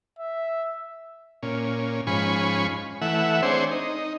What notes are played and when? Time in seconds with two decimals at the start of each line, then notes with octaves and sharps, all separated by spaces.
0.19 E5
1.43 A#2 C#4
2.07 G#2 F3 C#4 G#5 B5 C#6
3.01 E3 A3 E5 F#5
3.42 C4 D4 G#4 C5 C#5
3.71 D#4